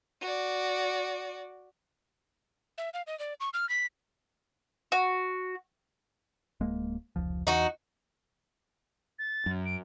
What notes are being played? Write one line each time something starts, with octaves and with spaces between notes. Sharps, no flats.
F#4 D5
E5
F5
D#5
D5
C#6
F6
B6
F#4
D1 G#3 A#3
F1 C#2 F3
E2 D#4 F#4
A6
F#2
D7